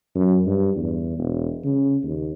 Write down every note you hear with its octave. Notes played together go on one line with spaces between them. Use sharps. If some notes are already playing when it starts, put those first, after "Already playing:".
F#2
G2
E2
E1
C#3
D#2